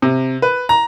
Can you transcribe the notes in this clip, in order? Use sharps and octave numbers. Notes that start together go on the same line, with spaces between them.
C3
B4
A#5